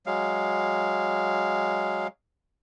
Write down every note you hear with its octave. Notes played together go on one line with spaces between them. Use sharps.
F#3 G#3 F5